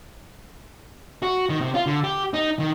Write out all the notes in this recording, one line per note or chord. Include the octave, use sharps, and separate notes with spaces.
F#4
D#3
C3
F4
D3
G4
D#4
D#3